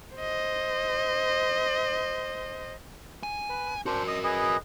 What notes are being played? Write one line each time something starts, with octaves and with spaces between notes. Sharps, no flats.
C5 D#5
G#5
B4
D4 F#4 A#4 C5
D#5 D#6
G#4 B4 D#5